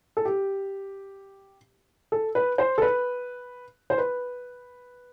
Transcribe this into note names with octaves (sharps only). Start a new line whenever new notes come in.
A4
G4
A4
B4
C5
A4
B4
C5
B4